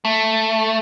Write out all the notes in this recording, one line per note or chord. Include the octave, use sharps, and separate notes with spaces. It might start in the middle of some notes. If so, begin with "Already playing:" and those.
A3